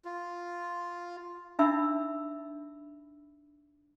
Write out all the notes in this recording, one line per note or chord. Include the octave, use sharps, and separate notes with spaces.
F4
D4 D#4 E5 B5 E6